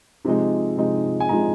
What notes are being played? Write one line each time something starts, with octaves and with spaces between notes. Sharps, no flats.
C3 F3 G#3 D#4
C3 F3 G#3 D#4
G#5
C3 F3 G#3 D#4 A#5